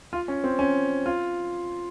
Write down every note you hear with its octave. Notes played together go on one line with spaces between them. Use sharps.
F4
C#4
C4
C#4
F4